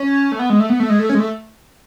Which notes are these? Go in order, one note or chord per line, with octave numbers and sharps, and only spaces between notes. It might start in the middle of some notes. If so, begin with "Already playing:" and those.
Already playing: C#4
A3
B3
G#3
A3
B3
A3
G#3
A3
C#4
G#3
A3